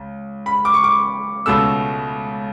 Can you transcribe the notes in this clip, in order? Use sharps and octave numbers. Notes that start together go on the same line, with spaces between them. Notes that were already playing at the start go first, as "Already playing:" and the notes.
Already playing: C#2
B5
D6
C#6
D6
C#2 B2 A3 E6